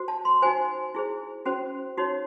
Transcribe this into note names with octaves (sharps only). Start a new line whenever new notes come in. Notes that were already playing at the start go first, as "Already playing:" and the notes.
Already playing: F#4 C5
A5
C6
D#4 F#4 C5 G#5
E4 G#4 C5
C#4 F#4 C5
D#4 F#4 C#5